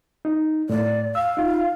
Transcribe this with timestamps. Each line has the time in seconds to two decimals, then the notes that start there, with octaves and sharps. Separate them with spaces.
0.25 D#4
0.70 A2 D5
1.15 F5 E6
1.37 D#4 F4